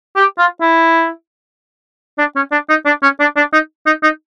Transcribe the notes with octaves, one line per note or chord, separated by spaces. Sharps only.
G4
F4
E4
D4
C#4
D4
D#4
D4
C#4
D4
D4
D#4
D#4
D#4